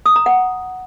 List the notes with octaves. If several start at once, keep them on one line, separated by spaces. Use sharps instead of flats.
D#6
A#5
F#5